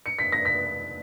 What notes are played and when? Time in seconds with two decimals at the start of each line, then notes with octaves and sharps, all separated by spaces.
0.06 C#7
0.19 B6
0.32 A#6
0.45 B6